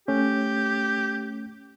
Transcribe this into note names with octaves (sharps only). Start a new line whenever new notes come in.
A3 C#4 G4